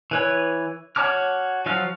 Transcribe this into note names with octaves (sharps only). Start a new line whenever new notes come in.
E3 B4 C#5
F#4 C#5 A5 D6 F6
F3 F#3 F#4 F5